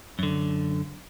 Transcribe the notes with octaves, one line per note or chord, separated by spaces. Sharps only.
F#2 D3